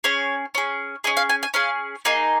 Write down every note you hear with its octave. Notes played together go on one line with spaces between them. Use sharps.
C#4 G#4 C#5
C#4 G#4
C#4 G#4 D#5
F5
G#5
G#5
C#4 G#4 F5
A#3 D#4 G#4 D#5